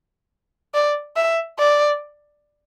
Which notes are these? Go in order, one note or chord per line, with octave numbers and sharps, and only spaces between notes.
D5
E5
D5